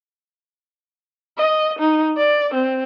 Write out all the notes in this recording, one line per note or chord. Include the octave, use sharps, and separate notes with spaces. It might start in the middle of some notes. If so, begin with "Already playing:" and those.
D#5
D#4
D5
C4